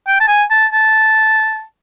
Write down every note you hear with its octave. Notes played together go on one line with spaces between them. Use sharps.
G5
A5
G#5
A5
A5